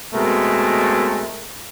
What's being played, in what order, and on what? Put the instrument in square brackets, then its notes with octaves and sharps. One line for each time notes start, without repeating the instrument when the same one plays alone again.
[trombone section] B2 G#3 A3 C4 A#4